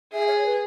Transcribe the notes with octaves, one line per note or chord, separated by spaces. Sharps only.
G#4 E5
C#5
B4